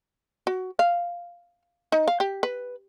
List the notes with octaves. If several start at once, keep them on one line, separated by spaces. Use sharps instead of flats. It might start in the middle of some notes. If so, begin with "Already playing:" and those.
F#4
F5
D#4
F5
G4
B4